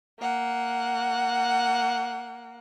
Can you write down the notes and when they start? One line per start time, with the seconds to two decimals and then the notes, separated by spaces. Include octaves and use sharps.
0.20 A#3 F#5